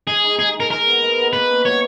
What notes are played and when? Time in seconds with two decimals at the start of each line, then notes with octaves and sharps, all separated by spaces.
0.07 G#3 G#4
0.24 D#4
0.39 G#3 G#4
0.54 D#4
0.60 A#4
0.71 G#3 A#4
0.87 B3
1.02 G#3
1.17 B3
1.33 A#3 B4
1.50 C#4
1.65 F#3 C#5